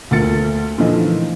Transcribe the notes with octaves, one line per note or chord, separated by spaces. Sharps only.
D2 A3 A#3 F4 A6 C#7
A#2 D3 E3 F3 A3 D#4